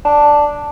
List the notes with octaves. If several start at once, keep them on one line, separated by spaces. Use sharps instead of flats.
D4